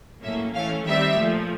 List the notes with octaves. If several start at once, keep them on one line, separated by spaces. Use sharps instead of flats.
A2 F#3 A#3 C#4 E5
E3 A3 C#4 F5
D#3 G3 C4 E5
A#2 F3 A3